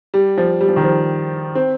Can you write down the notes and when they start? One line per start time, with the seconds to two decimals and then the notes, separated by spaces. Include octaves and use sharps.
0.14 G3
0.37 F3
0.61 G3
0.69 F3
0.76 D#3
0.83 F3
1.55 C4